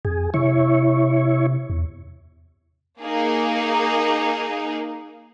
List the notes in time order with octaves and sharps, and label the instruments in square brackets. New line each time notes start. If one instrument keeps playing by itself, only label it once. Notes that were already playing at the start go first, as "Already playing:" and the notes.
[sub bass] F2 [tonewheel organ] G#4
[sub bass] C3 [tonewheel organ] E4 C#5
[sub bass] E2
[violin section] A#3 D#4 G#4